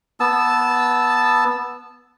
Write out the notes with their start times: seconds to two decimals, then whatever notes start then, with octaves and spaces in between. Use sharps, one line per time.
0.20 B3 A5 E6